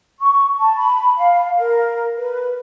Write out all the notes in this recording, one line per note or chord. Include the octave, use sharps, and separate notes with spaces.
C#6
A5
B5
F5
A#4
B4